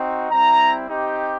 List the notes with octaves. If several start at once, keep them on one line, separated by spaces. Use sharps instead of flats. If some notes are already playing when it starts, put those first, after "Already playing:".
Already playing: C4 D#4 F#4
G3 C4 E4 A#5
C4 D#4 G4